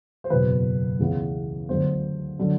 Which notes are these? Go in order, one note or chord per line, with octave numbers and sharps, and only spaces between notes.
C5
F#1 E2 B2 B4
C#2 C#3 E3 G#3 B3
D2 D3 F#3 B3 C5
D3 F#3